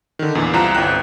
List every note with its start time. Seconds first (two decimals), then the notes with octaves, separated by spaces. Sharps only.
0.19 D3 D#3
0.35 E2 A#2 E3
0.53 C2 C4 F4 A#5 F#6 E7
0.75 G1 C2 G5 F#6